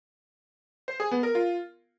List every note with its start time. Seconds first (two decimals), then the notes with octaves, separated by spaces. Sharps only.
0.88 C5
1.00 G#4
1.11 B3
1.23 A#4
1.35 F4